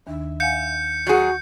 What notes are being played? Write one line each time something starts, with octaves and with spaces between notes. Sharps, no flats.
D#2 D#3 D4 E5
F5 F#5 G#5 G6 C#7
F#3 F#4 G#4